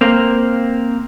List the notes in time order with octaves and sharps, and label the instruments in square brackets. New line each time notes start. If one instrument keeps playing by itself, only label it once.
[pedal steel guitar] A#3 C4